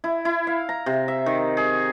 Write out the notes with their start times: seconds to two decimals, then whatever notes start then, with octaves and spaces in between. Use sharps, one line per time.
0.04 E4
0.25 E4
0.47 F5
0.69 A#5
0.86 C3
1.08 E5
1.26 D#3
1.57 G#4